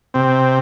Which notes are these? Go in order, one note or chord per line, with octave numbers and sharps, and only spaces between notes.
C3 C4